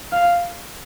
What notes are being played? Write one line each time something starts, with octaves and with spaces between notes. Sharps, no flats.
F5